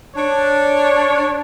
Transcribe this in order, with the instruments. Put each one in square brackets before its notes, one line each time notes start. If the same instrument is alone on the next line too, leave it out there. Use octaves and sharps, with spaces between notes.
[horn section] D4 C#5